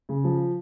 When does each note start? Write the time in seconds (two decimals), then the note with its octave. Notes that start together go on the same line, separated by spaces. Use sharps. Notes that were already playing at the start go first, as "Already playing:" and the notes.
0.09 C#3
0.24 F3